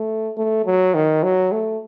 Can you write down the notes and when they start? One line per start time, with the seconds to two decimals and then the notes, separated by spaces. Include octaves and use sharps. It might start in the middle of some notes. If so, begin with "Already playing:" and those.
Already playing: A3
0.37 A3
0.66 F#3
0.95 D#3
1.23 F#3
1.52 A3